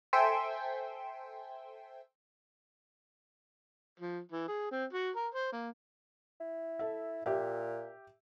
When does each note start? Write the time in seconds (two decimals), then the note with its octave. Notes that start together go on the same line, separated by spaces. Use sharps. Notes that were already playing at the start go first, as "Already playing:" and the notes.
0.13 A4 C5 E5 G5 G#5 C6
4.00 F3
4.32 E3
4.48 G#4
4.71 C4
4.93 F#4
5.16 A#4
5.34 C5
5.52 A#3
6.40 E4
6.79 A4 E5
7.26 A#2 G4 E5